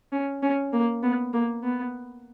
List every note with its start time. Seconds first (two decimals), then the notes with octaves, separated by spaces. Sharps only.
0.12 C#4
0.43 C#4
0.73 A#3
1.03 B3
1.33 A#3
1.63 B3